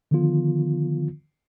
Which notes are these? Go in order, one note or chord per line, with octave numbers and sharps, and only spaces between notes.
D3 D#3 F3 B3 F4